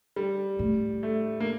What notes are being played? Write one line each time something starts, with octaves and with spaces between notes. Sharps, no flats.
G3
A2
A3
A#3